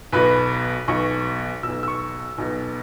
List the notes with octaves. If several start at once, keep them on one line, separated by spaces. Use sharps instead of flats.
B1 B2 B4
B1 B2 C#6
B1 B2 E6
E6
C#6
B1 B2